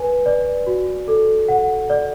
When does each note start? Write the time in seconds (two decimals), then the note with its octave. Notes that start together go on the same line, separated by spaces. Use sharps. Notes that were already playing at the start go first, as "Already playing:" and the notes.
Already playing: B4 G#5
0.26 D5
0.67 F#4
1.08 A4
1.48 F#5
1.90 D5